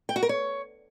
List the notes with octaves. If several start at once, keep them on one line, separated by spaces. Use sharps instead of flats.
G5
F#4
A#4
C#5